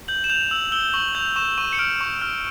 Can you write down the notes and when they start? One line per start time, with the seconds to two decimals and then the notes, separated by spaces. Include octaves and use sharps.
0.08 G6 F#7
0.24 E7
0.30 G6 F7
0.51 E6 F#7
0.72 E6 G7
0.94 C#6 F#7
1.15 G6 F7
1.36 C#6 E7
1.58 C#6 D#7
1.73 C#7
1.79 F6 D7
2.01 C#6
2.22 F6